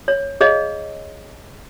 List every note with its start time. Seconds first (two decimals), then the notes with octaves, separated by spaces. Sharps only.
0.08 C#5
0.41 G#4 C#5 D#5 F5